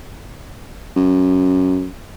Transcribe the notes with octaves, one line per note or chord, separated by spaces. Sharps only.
F#2